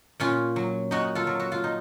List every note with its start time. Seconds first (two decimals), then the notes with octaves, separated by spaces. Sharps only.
0.20 A#2 C#4 F4
0.56 F#3
0.91 A#2 D#4 F#4
1.15 F4 A4
1.27 F#3
1.40 F#4
1.52 F4
1.64 D#4